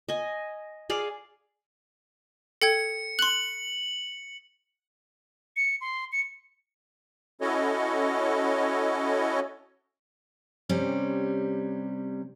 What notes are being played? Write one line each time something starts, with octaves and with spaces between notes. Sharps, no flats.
D#5 G#5
G#4 D5 F5
A4 G5 G#6 C#7
C6 F#6 F#7
C#7
C6
C#7
C#4 E4 F#4 A4 C#5 D#5
C3 G3 C#4